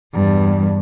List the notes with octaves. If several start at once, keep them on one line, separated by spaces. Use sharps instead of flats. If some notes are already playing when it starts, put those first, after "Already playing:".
E2 G2